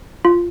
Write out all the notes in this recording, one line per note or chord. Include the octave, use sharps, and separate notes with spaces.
F4